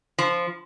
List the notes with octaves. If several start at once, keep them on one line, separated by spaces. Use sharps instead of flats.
F3